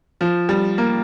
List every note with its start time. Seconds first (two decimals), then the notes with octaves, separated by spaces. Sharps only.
0.21 F3
0.49 G3
0.78 A#3